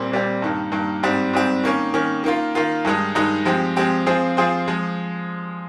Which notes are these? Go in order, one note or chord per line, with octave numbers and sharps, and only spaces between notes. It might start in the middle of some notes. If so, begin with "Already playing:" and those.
Already playing: A#2 G3 C4
A#2 G3 C4
G2 D#3 A#3
G2 D#3 A#3
G#2 G3 C4
G#2 G3 C4
D#3 A#3 C#4
D#3 A#3 C#4
D#3 A#3 F4
D#3 A#3 F4
G2 D#3 G#3 D#4
G2 D#3 G#3 D#4
F3 G#3 C4 G4
F3 G#3 C4 G4
F3 C4 F4 G#4 C5
F3 C4 F4 G#4 C5
F3 G#3